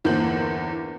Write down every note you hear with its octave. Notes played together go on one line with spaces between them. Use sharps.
G1 E2 A#3 C5 G6 F#7